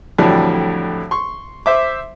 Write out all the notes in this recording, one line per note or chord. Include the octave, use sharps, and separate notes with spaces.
F2 A2 D3 E3 F#3 G3
C6 C#6
C5 E5 D6